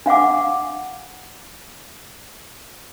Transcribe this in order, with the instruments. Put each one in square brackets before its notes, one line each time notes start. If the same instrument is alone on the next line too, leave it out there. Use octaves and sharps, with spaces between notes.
[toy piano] D4 F5 F#5 D6